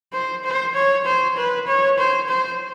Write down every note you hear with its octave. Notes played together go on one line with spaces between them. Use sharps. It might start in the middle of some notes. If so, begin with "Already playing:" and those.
C5
C5
C#5
C5
B4
C#5
C5
C5